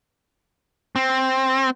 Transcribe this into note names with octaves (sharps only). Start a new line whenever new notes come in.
C4